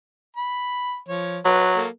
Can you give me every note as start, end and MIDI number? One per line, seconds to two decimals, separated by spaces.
0.37 0.98 83
1.08 1.39 53
1.08 1.39 73
1.45 1.84 54
1.45 1.74 71
1.76 1.88 58
1.76 1.88 69